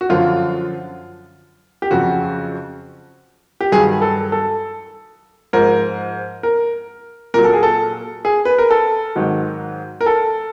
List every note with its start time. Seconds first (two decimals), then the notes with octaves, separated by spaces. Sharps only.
0.01 F#4
0.09 F#2 D3 F3 F4
1.82 G4
1.90 F2 C#3 F#3 F#4
3.60 G4
3.72 G2 D#3 F#3 G#4
4.02 A4
4.32 A4
5.53 G#2 F3 A#4
6.43 A#4
7.34 A#2 F#3 A#4
7.44 A4
7.53 G#4
7.63 A4
8.25 G#4
8.45 B4
8.58 A#4
8.71 A4
9.16 G#2 D#3 F#3
10.01 A#4
10.06 A4